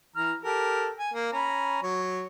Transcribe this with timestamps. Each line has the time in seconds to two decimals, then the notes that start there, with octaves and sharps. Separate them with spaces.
0.16 E3 A#5 F6
0.44 G4 A4 A#4
0.99 G#5
1.14 A#3
1.33 C#4 A#5 B5
1.83 F#3 C#5